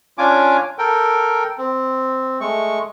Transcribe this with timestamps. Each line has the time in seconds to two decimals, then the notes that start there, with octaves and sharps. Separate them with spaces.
0.18 C#4 D4 F4 G#5 D6
0.78 A4 A#4 G5
1.58 C4
2.41 G#3 A3 C#6